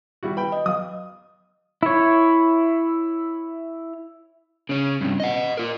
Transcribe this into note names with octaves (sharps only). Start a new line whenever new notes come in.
G3 E4 F#4
B4 G5 B5
D#5
F#3 F5 D#6
E4 C#5
C#3 C#4
G2 C3
D#5 F#5
F4 A#4